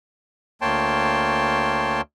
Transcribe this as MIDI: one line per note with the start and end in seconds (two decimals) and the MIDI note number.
0.62 2.01 38
0.62 2.01 58
0.62 2.01 73
0.62 2.01 79
0.62 2.01 81
0.62 2.01 84